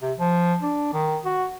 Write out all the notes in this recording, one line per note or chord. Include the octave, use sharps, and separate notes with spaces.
C3
F3
D4
D#3
F#4